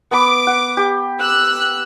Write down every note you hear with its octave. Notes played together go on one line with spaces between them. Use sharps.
B3 B5 D6
F#5
G4
E6 F#6